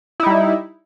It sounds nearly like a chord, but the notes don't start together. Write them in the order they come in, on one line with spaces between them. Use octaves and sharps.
E4 D#4 G3